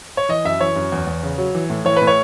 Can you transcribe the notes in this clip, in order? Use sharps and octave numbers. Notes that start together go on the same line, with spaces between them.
C#5
E3 D#5
F#2 E5
E3 C#5
F#2
E2
E2
C#3
F#3
E3
A2
E3 C#5
A2 B4
C#5